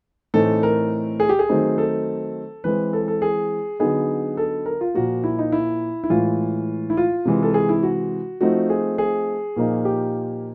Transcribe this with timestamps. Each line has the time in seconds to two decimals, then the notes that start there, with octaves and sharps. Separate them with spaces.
0.34 A2 E3 A3 C4 D#4 A4
0.63 A#4
1.20 G#4
1.29 G4
1.39 G#4
1.49 D#3 F#3 A3 C4 D#4
1.78 A4
2.64 E3 G#3 C4 B4
2.93 A4
3.08 A4
3.22 G#4
3.79 D3 F#3 B3 D#4 G#4
4.37 A4
4.66 A#4
4.81 F4
4.94 A#2 F3 A#3 F#4
5.24 E4
5.38 D#4
5.52 E4
6.04 E4
6.10 A2 E3 G#3 F4
6.90 E4
6.97 F4
7.25 C3 E3 G#3
7.43 A4
7.54 G#4
7.69 E4
7.83 F#4
8.41 F3 A3 C4 D#4 F#4
8.70 G#4
8.98 G#4
9.56 A#2 F3 A#3 D#4
9.85 G4